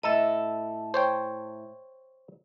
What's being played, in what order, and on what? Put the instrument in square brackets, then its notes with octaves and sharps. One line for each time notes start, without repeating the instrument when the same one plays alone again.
[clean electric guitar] A2 A4 [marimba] D#5 E5
[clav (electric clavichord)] C5 C#5 G5